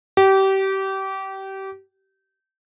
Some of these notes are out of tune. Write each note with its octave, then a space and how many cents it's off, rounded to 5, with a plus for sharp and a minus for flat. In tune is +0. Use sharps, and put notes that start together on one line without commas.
G4 -25